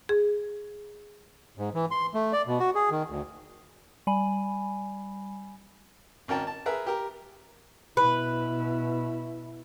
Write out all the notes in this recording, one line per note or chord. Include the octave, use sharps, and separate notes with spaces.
G#4
G#2
E3
C6
A3
D5
B2
F#4
G#4
D#3
D2
G3 G#5 B5
G#1 C#4 A#4 G5 A5
A5
G#4 A#4 B4 E5
G4 A#4
B2 E4 B4